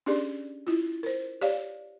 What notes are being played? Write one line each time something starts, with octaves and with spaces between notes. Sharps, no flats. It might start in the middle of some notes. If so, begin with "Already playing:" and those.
C#4 D4 G4 G#4 D5
E4 F4
A#4 C5
G4 C#5 D5 F5